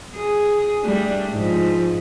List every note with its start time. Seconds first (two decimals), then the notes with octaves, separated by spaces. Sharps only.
0.16 G#4
0.82 G3 A3 D4
1.32 G#2 F3